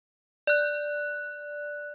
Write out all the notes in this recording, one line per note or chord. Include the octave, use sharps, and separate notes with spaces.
D5 F#6